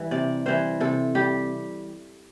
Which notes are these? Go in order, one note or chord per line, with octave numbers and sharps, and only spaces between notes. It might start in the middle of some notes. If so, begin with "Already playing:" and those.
Already playing: E3 G3
C3 D5
E3 G3 C5
C3 A4
G3 G4